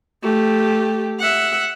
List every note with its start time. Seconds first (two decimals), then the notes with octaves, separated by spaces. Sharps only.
0.23 A3 G4
1.20 E5 F#5